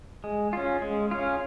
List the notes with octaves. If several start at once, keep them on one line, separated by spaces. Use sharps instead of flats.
G#3
C#4 F4
G#3
C#4 F4